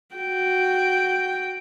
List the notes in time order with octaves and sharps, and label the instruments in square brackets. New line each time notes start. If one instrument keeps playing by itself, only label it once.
[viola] F#4 G5